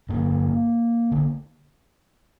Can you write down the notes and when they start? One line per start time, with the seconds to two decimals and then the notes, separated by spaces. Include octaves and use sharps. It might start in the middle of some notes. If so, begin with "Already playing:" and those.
0.09 G2 D3 A#3
1.12 D3